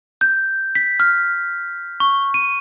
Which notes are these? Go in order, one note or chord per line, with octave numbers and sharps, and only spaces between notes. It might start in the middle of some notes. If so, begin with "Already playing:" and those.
G6
B6
F6
C#6
D#7